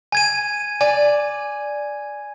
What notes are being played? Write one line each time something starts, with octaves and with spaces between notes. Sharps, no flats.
G#5 G#6 D#7
D5 G#5